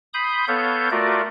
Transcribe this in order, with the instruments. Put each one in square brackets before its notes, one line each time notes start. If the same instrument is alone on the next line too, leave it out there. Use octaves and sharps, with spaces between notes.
[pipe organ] B5 C6 D#6 G6
B3 A4 C#5 F5 G6
A3 F4 F#4 A#4 D5